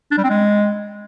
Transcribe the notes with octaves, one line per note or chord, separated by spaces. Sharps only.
D4
G3
C4
G#3